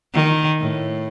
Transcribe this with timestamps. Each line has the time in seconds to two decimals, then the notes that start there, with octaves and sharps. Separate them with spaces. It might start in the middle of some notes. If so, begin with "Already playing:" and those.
0.14 D#3
0.60 A2